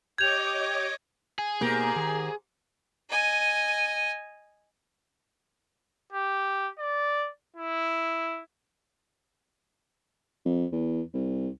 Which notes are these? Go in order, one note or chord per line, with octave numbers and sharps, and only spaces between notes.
G4 C#5 D#5 D6 G6 G#6 F7
G#4
G#2 B2 A#3 B3 G4 A#4
D#3
D#5 G#5
G4
D5
E4
F2
E2
C2